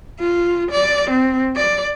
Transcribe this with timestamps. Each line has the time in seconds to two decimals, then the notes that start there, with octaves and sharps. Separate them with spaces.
0.20 F4
0.71 D5
1.10 C4
1.56 D5